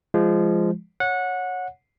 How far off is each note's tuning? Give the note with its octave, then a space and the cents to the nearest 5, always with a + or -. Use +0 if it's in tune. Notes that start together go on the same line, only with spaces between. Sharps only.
F3 -20 G#3 -10
C#5 +0 F#5 -20